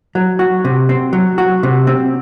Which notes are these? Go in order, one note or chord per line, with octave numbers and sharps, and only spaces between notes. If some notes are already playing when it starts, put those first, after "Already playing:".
F#3
F#4
C3
C4
F#3
F#4
C3
C4